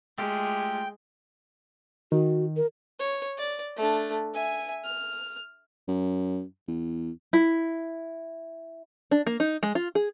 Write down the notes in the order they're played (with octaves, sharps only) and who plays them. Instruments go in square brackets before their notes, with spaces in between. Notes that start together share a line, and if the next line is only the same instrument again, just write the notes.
[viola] G#3 [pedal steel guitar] A3 F4 G4 [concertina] G5
[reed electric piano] D#3 [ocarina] F#4
[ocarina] A#4
[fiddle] C#5
D5
A3 D4
E5 G#5
F6
[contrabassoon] F#2
E2
[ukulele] E4
[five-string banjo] D4
A#3
D#4
G#3
F4
G#4